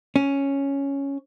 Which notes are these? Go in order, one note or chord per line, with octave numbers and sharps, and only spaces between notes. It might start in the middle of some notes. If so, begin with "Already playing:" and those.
C#4